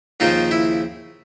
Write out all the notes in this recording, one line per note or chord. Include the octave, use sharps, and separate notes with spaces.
D#2 C#3 F3 D#4 F4
E4